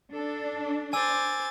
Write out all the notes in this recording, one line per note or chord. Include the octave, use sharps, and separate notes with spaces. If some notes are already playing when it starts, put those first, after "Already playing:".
D4 A4
C5 G#5 D6 E6 G#6 A6